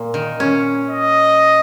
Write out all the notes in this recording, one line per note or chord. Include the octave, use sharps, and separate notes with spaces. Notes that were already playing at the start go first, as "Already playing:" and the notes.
Already playing: A#2
D#3
C#4
D#5